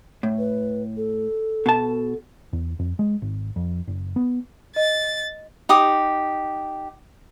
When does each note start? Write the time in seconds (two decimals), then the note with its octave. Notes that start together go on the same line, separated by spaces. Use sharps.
0.23 A2
0.38 B4
0.97 A4
1.66 B2 A5
2.53 E2
2.79 F2
2.99 G#3
3.22 G#1
3.56 F2
3.87 F#1
4.16 B3
4.76 D#5 A6
5.69 D#4 G4 D6 D#6